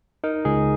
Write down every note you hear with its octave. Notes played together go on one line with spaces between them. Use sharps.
D#4 A#4
C#2 G#4